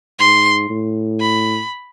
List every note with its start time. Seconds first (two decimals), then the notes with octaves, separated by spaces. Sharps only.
0.19 G#2 C6
0.70 A2
1.20 B5